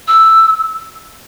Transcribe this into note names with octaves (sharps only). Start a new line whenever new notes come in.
E6